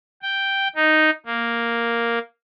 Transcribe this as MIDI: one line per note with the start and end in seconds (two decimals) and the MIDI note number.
0.22 0.68 79
0.75 1.10 63
1.26 2.19 58